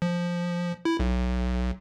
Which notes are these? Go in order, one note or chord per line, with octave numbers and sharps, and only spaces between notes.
F3
E4
B1